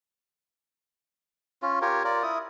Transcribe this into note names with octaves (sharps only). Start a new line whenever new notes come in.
C#4 F4
F4 G4 A#4 C#5
F4 A#4 D5
E4 D#6